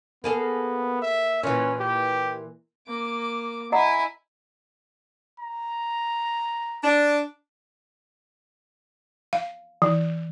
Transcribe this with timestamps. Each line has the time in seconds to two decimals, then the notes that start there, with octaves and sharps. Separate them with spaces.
0.24 A#3 B3 G#4 A4
1.02 E5
1.43 A#2 E3 C#4
1.80 G4
2.88 A#3 D6
3.72 E4 D#5 F#5 G#5 A#5
5.40 A#5
6.84 D4
9.33 F5
9.82 E3